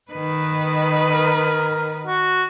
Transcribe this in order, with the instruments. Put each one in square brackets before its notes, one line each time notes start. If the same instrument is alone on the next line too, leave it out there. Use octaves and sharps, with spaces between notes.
[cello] D#3 B4
[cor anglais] A#4
F#4